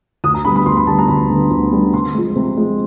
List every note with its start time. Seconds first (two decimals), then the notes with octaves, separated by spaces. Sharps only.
0.24 D2 D#6
0.34 A#5
0.45 D3 G3 B3 B5
0.56 B5
0.66 D2 C6
0.77 B5
0.87 D3 G3 B3 A5
0.99 A#5
1.08 D2 B5
1.30 D3 G3 B3
1.51 D2
1.72 D3 G3 B3
1.93 C3 C6
2.15 F3 G#3
2.36 C3
2.57 F3 G#3